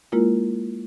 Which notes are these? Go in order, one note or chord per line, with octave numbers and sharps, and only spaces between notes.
G#3 A#3 E4 F4 A#4